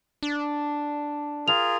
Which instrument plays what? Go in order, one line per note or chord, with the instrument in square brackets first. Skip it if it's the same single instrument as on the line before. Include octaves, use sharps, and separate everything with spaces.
[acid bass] D4
[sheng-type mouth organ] F4 G#4 A#4 [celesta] F7